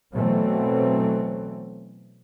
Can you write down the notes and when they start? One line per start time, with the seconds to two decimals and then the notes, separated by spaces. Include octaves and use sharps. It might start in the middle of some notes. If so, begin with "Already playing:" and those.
0.13 B2 E3 F#3 A3 C4